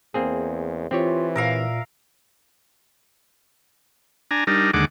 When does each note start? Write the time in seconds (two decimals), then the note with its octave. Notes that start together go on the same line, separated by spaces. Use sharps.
0.14 E2 A#3 C4 G#4
0.91 E3 C4 F4 G4 C#5
1.36 A#2 A#4 E5 F5
4.31 D4 G#5 A#5
4.47 G3 D4 D#4 A#4
4.74 D#2 D3 G#3 F#5 D6